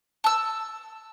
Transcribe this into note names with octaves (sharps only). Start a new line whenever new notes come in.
A5 E6